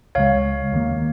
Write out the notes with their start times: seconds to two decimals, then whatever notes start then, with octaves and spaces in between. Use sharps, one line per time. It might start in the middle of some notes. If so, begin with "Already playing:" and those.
0.15 C#2 C#3 G#3 C#5 F5
0.72 D#2 D#3 A#3